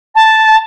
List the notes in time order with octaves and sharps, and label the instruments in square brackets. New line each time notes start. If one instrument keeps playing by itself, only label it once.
[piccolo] A5